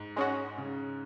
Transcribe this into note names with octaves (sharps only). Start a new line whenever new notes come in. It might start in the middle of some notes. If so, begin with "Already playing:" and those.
Already playing: G#2
G#3 C#4 F#4
C#3